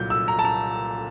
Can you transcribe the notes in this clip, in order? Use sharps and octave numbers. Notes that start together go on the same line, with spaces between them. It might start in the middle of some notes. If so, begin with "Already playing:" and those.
Already playing: C2 A#2 F#3 G6
E6
A#5
A5
A#5